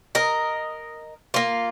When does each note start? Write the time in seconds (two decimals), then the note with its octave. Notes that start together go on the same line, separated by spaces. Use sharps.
0.15 A#4 D#5
1.34 A#3 F4